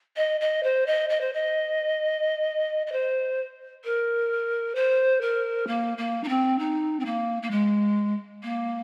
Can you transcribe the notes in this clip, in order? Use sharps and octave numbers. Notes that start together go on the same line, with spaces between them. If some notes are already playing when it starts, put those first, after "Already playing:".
D#5
D#5
C5
D#5
D#5
C5
D#5
D#5
C5
A#4
C5
A#4
A#3
A#3
D#4
C4
D#4
C4
A#3
A#3
G#3
A#3